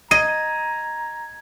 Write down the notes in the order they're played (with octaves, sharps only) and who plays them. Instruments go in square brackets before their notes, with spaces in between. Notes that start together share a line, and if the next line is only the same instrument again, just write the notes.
[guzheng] D#5 [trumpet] A#5 [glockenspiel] G#6 [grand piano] D#7